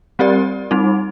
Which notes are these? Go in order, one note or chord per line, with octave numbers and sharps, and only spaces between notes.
G3 C4 G4 A#4 D5
G3 C4 D#4